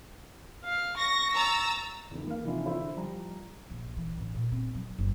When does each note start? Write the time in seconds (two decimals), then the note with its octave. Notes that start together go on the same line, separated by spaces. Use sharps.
0.65 F5
0.97 C#6 A#6
1.33 A#5 E6 A6
2.11 E2 D#3
2.27 A#3 F5
2.44 C3 E3 F3 D4 D#4 F4
2.66 D3 E4 C5
2.96 F3 G3 A#5
3.70 A#1
3.97 E3
4.18 A1
4.35 A#2
4.52 C4
4.75 F#3
4.98 F#1